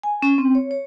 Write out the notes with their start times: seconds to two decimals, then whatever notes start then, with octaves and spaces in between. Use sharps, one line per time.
0.03 G#5
0.22 C#4
0.38 C4
0.55 C#5
0.71 C#5